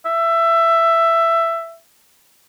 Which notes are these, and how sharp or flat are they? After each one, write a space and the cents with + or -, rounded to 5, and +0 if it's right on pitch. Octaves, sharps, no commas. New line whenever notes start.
E5 +15